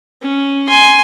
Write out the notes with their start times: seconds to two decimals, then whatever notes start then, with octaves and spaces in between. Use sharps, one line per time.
0.22 C#4
0.67 G#5 C6